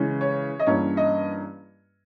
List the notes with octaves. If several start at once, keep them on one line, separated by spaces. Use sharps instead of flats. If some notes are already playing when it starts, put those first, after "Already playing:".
Already playing: C#3 E3 G#3 C#4
C#5
D#5
G2 E3 A#3 C#4 C#5
D#5